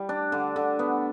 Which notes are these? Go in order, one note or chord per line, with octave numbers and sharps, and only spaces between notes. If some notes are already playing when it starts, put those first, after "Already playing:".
Already playing: G3
D4
D3
D3
B3